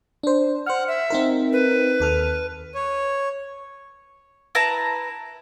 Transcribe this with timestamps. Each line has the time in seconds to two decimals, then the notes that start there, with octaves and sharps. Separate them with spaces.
0.23 D4 C5
0.66 C5 F#5 F6
0.88 E5
1.10 C4 D#4 A#4
1.53 B4
2.00 D#2 A4 F6
2.75 C#5
4.55 E4 B4 A5 A#5